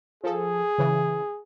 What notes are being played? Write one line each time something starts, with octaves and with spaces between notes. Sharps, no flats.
F3 G#4 A4
C#3 E3